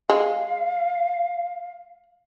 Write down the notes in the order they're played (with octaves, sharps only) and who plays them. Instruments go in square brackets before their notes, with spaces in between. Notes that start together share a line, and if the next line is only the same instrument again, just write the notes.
[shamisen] G#3 [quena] F5